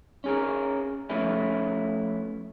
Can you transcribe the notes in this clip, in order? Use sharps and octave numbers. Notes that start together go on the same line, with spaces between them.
C#4 G#4 A#4
F3 A3 B3 C#4 E4